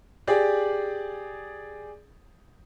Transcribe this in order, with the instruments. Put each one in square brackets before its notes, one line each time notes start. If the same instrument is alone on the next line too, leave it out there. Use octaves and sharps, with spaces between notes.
[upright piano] G4 G#4 D5